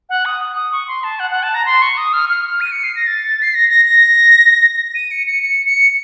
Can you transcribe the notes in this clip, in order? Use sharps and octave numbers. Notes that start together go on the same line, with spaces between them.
F#5
D#6
D#6
C#6
C6
A5
F#5
F#5
A5
A#5
C6
C#6
D#6
F6
F6
F6
D#7
C#7
C7
A#6
A6
C7
A#6
A#6
A#6
D#7
C#7
C#7
C#7
C#7